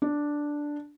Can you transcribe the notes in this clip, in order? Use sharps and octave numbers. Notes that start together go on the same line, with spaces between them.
D4